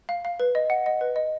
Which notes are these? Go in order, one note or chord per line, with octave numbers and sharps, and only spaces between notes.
F5
F5
B4
D#5
F#5
D#5
B4
D#5